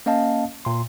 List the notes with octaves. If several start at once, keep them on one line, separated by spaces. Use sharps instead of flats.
A#3 C#4 D#5 F5 A5
A#2 C6